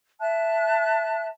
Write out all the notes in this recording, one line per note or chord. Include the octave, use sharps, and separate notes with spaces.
E5 A5 F#6